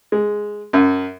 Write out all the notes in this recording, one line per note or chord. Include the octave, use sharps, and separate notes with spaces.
G#3
F#2